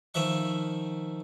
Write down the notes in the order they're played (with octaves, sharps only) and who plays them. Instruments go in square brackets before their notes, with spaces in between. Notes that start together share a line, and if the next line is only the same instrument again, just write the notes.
[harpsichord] D#3 F3 E5 C#6